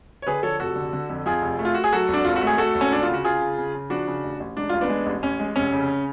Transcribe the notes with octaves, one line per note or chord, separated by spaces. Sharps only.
C#5
D3 G#4 B4
F3 A4 C#5
F1 F#4 A4
D3
D3
F2
F2 F4 G#4
F1
A3
F4
A3 F#4
G#4
F#3 F#4 A4
G#1
D4
G#1 F4
F#4
A3
G#4
A3 F#4 A4
G#1
C#4
D2 D4
F4
C#3
F#4
C#3 F4 G#4
C#3
C#3
C#3
F3 D4 F#4
C#3
A1
A1
G#2 D4
A1 F4
B3 D4
G#3
A1
A1 C#4
G#3
F1 C#4
C#3